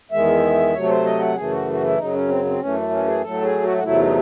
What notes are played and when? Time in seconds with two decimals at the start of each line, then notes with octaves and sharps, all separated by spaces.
0.12 E2 D#3 G#3 E5
0.74 C3 F#3 A3 C#5
0.84 A4
0.89 C5
1.05 D#5
1.20 F#5
1.35 F#2 C#3 E3 A3 G#4
1.51 F#4
1.72 F#4
1.83 E4
1.98 F#2 C#3 F#3 D#4
2.13 C#4
2.28 C4
2.45 C4
2.60 F#2 E3 A3 C#4
2.91 C#4
3.06 G#4
3.22 A2 F#3 A3 A4
3.42 G#4
3.63 F#4
3.77 F#4
3.84 E2 C3 F#3 A3 E4
3.99 D#4